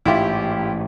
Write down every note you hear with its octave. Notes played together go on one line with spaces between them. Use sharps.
A1 G#2 E4 F4 G4